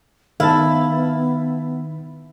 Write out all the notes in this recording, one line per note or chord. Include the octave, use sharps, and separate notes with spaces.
D#3 B3 E4 F5 A5